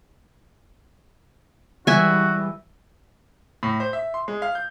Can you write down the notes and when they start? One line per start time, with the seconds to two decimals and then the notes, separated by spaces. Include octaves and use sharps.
1.87 E3 G3 G#3 F#4 E5 G#5
3.63 A2
3.80 C5
3.93 E5
4.14 C6
4.28 G#3
4.42 F5
4.55 G6